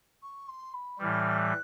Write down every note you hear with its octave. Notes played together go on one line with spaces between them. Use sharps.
C#6
C6
B5
A2 E3 G3 F6
F#6